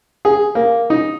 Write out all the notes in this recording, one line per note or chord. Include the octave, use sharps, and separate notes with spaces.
G#4
A#3
D#4